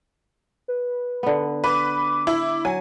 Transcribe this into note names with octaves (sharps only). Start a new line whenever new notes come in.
B4
D3 B3
B4 D6
E4
F#3 G#5